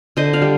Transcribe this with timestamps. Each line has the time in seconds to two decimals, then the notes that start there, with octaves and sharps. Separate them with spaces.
0.17 D3 C5 D#5
0.33 D5 F5
0.42 G3